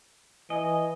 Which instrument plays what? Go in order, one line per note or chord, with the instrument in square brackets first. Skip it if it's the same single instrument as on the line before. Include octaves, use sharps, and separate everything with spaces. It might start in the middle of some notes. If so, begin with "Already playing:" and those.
[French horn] E3 [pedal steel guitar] D#5 [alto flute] G#5